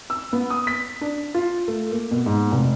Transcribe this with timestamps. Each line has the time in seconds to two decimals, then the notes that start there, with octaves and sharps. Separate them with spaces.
0.10 E6
0.33 B3
0.50 D#6
0.67 B6
1.01 D4
1.34 F4
1.68 A3
1.91 A#3
2.11 B2
2.26 G#2
2.52 F1